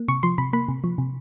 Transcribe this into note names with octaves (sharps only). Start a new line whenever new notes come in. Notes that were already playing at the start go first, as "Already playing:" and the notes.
Already playing: A#3
C3 C#6
F3 C6
C3 B5
A#3 B5
C3
F3
C3